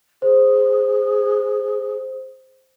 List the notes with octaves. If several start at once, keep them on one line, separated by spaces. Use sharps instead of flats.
G#4 C5